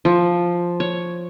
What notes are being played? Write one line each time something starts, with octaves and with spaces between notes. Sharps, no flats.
F3
C#5